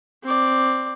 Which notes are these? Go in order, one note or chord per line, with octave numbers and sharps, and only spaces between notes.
C4 D5